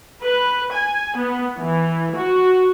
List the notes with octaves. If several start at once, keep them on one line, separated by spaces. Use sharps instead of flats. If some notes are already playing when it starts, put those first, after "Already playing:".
B4
G#5
B3
E3
F#4